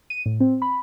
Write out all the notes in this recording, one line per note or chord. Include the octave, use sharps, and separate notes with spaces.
D#7
A2
C4
B5